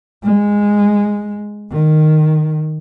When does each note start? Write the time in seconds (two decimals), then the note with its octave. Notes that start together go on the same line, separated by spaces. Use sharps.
0.23 G#3
1.71 D#3